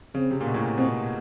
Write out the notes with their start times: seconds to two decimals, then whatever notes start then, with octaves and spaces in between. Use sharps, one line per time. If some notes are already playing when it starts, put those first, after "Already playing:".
0.14 C#3 C4
0.31 C3
0.41 A#2
0.47 B2
0.54 A2
0.62 A#2
0.77 B2 C4